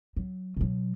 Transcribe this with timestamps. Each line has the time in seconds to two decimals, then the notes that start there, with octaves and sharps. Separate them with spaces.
0.17 F#3
0.57 B2 F#3